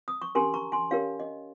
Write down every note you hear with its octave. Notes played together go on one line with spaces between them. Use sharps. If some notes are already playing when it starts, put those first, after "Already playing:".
D#6
C#6
C#4 G4 A#4 G#5 C6
A#5 C#6
G#5 C6
C#4 G4 A#4 C#5 F5
D#5